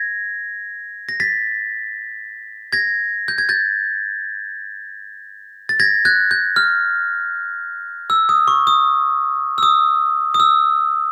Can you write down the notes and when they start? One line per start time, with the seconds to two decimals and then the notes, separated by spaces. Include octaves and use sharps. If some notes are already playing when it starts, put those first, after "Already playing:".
Already playing: G#6 A#6
1.09 A#6
1.20 A6 B6
2.73 G#6 A#6
3.28 G6
3.38 G#6
3.49 G6 A6
5.69 A6
5.80 G#6 A#6
6.05 F#6 G#6
6.31 G6
6.56 F6
8.10 E6
8.29 D#6
8.48 C#6
8.67 D#6
9.58 E6
9.63 D#6
10.34 D#6
10.40 E6